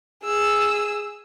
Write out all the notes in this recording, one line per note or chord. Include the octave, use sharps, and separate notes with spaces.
G#4 E6